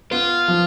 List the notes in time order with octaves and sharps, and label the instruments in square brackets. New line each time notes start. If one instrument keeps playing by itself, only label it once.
[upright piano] B3 [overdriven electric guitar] F4
[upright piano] F3